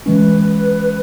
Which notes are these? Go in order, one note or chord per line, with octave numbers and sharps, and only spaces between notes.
E3 G#3 C#4 B4